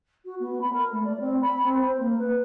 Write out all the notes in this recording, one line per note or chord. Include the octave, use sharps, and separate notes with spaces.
F#4
B3
B5
A#4
A3
D5
C4
B5
C4
C5
A#3
B4